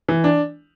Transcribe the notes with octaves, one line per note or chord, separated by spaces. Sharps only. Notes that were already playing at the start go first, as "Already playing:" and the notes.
E3
D4